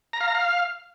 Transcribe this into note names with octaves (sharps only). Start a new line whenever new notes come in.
A#5
F5
A#5
F5